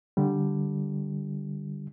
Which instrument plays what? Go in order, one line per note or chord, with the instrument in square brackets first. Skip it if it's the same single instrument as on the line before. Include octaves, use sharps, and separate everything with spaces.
[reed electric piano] D3 G3